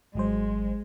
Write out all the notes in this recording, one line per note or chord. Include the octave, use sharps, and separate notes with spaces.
G#1 F#3 G#3 C5